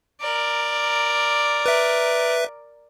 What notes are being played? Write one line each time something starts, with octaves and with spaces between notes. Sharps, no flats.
A#4 D5
B4 E5